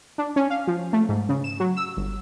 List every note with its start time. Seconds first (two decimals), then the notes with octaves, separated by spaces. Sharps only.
0.18 D4
0.36 C#4
0.50 F5
0.67 F3
0.93 A3
1.09 G#2
1.29 C#3
1.44 E7
1.60 F#3
1.77 E6
1.97 G1